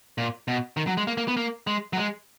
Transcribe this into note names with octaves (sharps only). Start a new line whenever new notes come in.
A#2
B2
D#3
F#3
G#3
A#3
A#3
B3
A#3
G#3
F#3
G#3